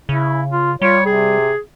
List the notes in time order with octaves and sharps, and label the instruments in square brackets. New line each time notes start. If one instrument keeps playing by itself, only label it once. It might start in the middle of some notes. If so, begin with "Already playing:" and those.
[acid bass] C#3 [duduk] E4
[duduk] F4
[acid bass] G3 [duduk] F4 [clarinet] C#5
[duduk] C3 [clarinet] G#4